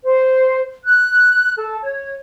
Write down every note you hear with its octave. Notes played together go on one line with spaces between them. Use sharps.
C5
F#6
A4
C#5